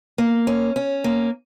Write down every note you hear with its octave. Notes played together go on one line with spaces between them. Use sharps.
A#3
C#4
C#4
A#3